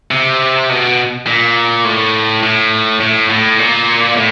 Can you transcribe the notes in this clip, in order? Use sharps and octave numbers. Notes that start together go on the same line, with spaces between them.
C3
B2
A#2
A2
A2
A2
A2
A#2
A2